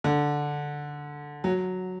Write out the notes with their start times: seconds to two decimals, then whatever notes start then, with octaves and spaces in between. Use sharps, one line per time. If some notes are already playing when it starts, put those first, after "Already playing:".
0.04 D3
1.44 F#3